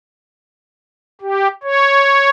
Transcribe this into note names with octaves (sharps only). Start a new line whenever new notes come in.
G4
C#5